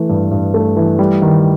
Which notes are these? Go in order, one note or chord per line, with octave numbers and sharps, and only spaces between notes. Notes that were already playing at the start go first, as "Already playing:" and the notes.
Already playing: E3 A3
G2
G2
A3
E3
G3
D#3